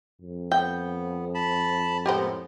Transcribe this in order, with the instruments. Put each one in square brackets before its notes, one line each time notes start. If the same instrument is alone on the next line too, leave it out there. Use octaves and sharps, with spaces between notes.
[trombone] F2
[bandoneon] B3 [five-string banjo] G5
[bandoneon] A5 B5
[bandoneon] A2 G#3 B3 [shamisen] G4 A#4 C5